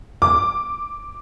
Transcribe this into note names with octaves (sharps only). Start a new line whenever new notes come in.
D6